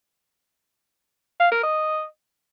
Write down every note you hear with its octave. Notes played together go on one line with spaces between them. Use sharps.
F5
A#4
D#5